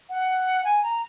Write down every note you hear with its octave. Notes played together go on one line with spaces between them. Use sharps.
F#5
G#5
A#5